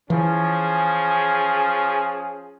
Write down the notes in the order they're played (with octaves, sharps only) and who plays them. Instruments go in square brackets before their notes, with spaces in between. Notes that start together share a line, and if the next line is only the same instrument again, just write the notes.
[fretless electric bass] E3 [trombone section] F3 C#4 G#4